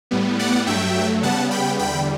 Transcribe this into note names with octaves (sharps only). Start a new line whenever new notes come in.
A2 G3 B3
D5 F#5
G2 F#3 A3 E5 G5
C#3 G3 B3 F#5 A5
G5 B5
E2 D3 G3 G5 B5